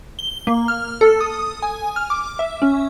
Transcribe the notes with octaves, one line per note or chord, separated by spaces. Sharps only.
G7
A#3
F6
A4
D#6
G#5
F6
D6
E5
C#4